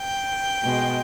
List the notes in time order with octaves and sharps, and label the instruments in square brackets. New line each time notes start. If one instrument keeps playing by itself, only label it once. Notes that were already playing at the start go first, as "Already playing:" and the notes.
Already playing: [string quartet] G5
B2 G#3